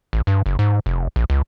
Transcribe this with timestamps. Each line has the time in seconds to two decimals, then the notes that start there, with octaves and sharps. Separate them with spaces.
0.13 A1
0.27 G2
0.46 F#1
0.59 G#2
0.86 F1
1.16 A#1
1.30 C#2